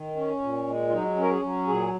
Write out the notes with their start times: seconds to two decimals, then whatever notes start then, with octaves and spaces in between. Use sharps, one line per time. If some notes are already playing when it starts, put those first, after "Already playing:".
Already playing: D#3
0.16 C#4
0.41 A#2
0.67 G#3
0.88 F4
0.92 F#3 D#4
1.17 C#4
1.22 A#4
1.30 G#4
1.42 F#3
1.67 A#2 G#4